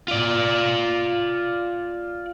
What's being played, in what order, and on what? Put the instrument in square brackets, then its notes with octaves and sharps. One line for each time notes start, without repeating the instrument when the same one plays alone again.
[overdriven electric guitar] F4 D5